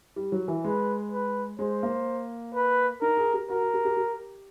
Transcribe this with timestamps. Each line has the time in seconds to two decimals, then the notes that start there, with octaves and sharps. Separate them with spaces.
0.16 G3
0.32 F#3
0.48 E3
0.64 G#3 B4
1.12 B4
1.59 G#3 C5
1.83 A#3
2.54 B4
3.01 D#4 A#4
3.17 G#4
3.34 G4
3.49 F#4 A#4
3.61 F#4
3.74 G4
3.85 G4
3.97 G4